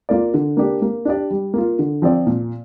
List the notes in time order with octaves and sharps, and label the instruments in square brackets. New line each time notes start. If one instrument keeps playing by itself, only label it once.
[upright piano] A#3 F4 A#4 D5
D3
A#3 D4 G4
A#3
D4 G4 D5
G3
A#3 F4
D3
F3 C4 F4 D5
A#2